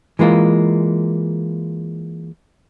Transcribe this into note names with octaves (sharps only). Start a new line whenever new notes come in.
E3 G#3 A#3 F4